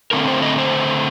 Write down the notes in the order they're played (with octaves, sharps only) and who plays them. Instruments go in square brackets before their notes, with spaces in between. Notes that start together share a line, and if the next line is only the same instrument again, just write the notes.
[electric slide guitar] D3 A3 C4 A#4
C5
D#5
C5